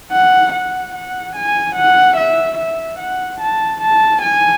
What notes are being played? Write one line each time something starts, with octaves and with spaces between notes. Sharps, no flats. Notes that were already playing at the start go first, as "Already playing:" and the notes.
F#5
F#5
F#5
G#5
F#5
E5
E5
F#5
A5
A5
G#5